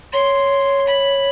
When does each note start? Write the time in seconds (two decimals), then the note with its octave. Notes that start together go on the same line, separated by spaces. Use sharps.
0.13 C#5 C6
0.87 B5